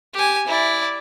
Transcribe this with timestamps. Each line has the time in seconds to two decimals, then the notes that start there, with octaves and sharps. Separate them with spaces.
0.14 G4 G#5
0.47 E4 D5